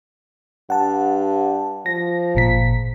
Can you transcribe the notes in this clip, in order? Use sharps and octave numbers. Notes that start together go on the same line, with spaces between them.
G2 F#5 A5
F3 A#6
G#1 A#2 B6